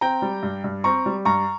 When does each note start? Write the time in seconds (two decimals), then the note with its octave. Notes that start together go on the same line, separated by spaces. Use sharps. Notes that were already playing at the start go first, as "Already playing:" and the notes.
0.01 C4 G5 A#5
0.22 G3
0.43 G2
0.64 G2
0.84 C4 A#5 C#6
1.06 G3
1.25 G2 A#5 C#6